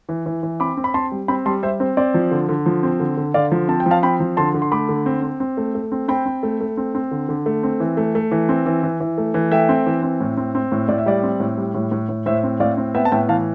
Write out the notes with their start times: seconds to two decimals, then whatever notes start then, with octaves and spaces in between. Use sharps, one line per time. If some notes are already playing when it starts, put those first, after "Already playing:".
0.09 E3
0.26 E3
0.43 E3
0.60 C4 B5 D6
0.77 C4
0.84 B5
0.94 C4 A5 C6
1.12 G3
1.28 C4 G5 B5
1.45 G3 A5 C6
1.63 G3 C5 E5
1.80 C4 C5
1.97 C4 D5
2.14 F3
2.31 D3
2.49 D3
2.66 F3
2.83 C4
3.00 D3
3.17 D3
3.34 D3 D5 F5
3.51 F3
3.68 C4 A5
3.80 G5
3.86 F3
3.91 F5 A5
4.03 C4 G5 B5
4.20 F3
4.37 D3 A5 C6
4.54 D3
4.62 C6
4.72 A3 B5 D6
4.89 D3
5.06 C4
5.23 C4
5.40 C4
5.57 A3
5.75 A3
5.92 C4
6.08 C4 G5 B5
6.26 C4
6.43 A3
6.60 A3
6.77 C4
6.95 C4
7.11 D3
7.29 D3
7.46 A3
7.63 C4
7.80 E3
7.97 A3
8.15 A3
8.31 E3
8.49 C4
8.66 E3
8.83 E3
9.00 E3
9.18 A3
9.34 E3
9.51 A3 E5 G5
9.69 C4
9.86 E3
10.03 C4
10.20 A2
10.37 C4
10.55 C4
10.72 A2
10.89 A2 D5
10.98 E5
11.06 G3 D5
11.23 C4
11.40 A2
11.57 G3
11.74 A2
11.92 A2
12.09 A2
12.26 A2 C5 E5
12.43 C4
12.60 A2 D5 F5
12.77 C4
12.95 B3 E5 G5
13.05 A5
13.12 A2 E5 G5
13.29 E3 F5 A5